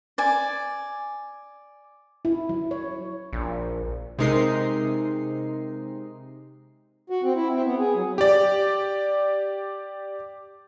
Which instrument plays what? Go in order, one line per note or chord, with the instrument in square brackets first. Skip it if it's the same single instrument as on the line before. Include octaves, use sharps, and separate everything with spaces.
[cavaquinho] D5 G#5
[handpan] E4
F#3
C#5
[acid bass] A#1
[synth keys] C3 G#3 D#4 A#4 C7
[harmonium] F#4
C4
E4
C4
B3
G#4
F#3
[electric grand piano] G4 D5